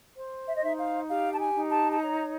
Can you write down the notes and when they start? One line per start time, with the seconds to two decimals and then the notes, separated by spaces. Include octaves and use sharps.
0.16 C5
0.47 E5
0.55 D#5
0.62 D#4 E5
0.78 F5
1.09 G4 F5
1.34 A5
1.40 G#5
1.55 D#4
1.70 A5
1.92 A5
2.01 C#5 A#5